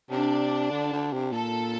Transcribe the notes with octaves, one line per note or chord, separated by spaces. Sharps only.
C3 D4
D3
D3
C3
A#2 A4